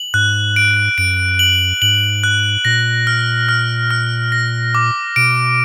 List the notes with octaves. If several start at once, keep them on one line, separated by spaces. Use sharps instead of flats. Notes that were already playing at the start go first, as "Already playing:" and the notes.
Already playing: F#7
G#2 F#6
D7
F#2 D7
F#7
G#2 F#7
F#6
A#2 A#6
F6
F6
F6
A#6
D6
B2 D7